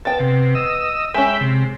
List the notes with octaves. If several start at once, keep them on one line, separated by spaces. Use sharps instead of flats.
B3 G5 A5
C3
D#5 E6
G#3 C#4 E5 G5 B5
C3